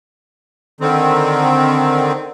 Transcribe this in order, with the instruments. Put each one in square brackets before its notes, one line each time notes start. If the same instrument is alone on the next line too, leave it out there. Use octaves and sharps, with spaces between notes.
[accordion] D3 D#3 C4